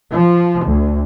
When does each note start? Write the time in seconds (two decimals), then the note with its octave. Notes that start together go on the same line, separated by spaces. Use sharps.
0.12 F3
0.65 D2